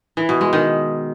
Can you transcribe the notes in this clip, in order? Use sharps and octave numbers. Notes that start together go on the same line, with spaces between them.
E3
B2
G#3
D#3